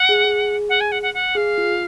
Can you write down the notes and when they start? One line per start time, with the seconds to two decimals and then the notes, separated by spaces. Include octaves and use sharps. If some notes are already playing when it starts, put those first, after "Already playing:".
Already playing: F#5
0.09 G#4
0.24 G#4
0.69 F#5
0.80 G#5
0.91 F#5
1.02 F#5
1.14 F#5
1.35 G#4 F5
1.58 F4